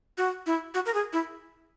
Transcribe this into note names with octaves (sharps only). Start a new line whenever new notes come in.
F#4
E4
F#4
A#4
G#4
E4